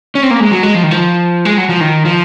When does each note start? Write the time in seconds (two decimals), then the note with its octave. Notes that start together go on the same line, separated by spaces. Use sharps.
0.15 C#4
0.23 C4
0.31 A#3
0.40 G#3
0.51 F#3
0.63 G#3
0.75 F3
0.83 D#3
0.91 F3
1.45 G#3
1.58 F#3
1.69 F3
1.81 D#3
2.05 F3